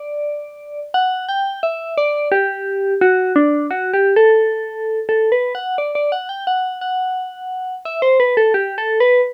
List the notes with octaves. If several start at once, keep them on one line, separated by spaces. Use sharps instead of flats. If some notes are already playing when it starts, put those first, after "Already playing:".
Already playing: D5
F#5
G5
E5
D5
G4
F#4
D4
F#4
G4
A4
A4
B4
F#5
D5
D5
F#5
G5
F#5
F#5
E5
C5
B4
A4
G4
A4
B4